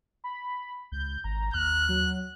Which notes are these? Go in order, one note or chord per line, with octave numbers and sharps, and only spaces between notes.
B5
C#2 G6
G#1 A#5
D#2 F6 F#6
F#3